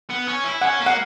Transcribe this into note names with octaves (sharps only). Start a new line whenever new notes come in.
B3
C#4
E4
C#4 F#5
A#3
F#5